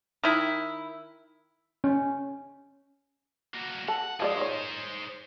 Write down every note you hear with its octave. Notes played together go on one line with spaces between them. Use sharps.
D#3 E4
C#4
A#3 F#4
A4 F#5 A5
F3 G#3 G#4 C5 D5
D#3 C#5